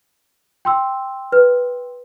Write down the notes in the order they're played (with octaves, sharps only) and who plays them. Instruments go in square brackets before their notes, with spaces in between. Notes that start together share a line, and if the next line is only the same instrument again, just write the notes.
[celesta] G5 C6 E6
[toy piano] B4